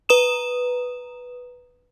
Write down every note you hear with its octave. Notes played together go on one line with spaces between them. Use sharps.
B4 A#5 D#6 E7